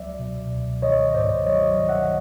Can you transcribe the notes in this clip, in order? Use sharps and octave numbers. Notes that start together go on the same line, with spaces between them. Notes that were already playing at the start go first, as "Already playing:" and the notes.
Already playing: C#2 F#3 D5 E5
B2
C#2
D#3 C#5 D#5
G#2 C5 D5
F#3 C#5 D#5
D#3
E5 F#5